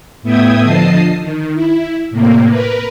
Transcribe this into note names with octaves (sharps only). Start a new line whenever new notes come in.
A2 B3 E5 G5 D#6 G#6
D3 F3 D#5 A5 D#6 C7
D#3
E4
A2 C3 A#3
A#4 B4